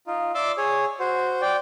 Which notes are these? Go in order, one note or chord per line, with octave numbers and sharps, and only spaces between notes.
D#4 F4
D5 E5 C6 D6 E6
G#4 C#5
F#4 C5
D5 G5